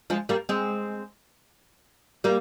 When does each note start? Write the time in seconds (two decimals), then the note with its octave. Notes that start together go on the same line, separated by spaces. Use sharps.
0.10 F3 G#3
0.29 G3 A#3
0.49 G#3 C4
2.24 G3 A#3